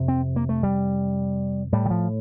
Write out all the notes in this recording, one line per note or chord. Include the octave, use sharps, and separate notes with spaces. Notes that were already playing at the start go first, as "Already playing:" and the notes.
Already playing: F2 C3
C4
A#3
A3
G3
A2 G3
D#3
F3